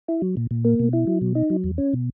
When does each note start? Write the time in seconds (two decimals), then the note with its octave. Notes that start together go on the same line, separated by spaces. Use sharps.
0.08 E4
0.22 F#3
0.37 A#2
0.51 A#2
0.65 A#3
0.80 B2
0.93 E4
1.07 F#3
1.22 B2
1.35 D#4
1.50 F#3
1.64 E2
1.78 C#4
1.93 B2